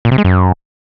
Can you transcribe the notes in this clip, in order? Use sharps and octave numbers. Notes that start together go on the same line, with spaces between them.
A#2
C3
G#3
F#2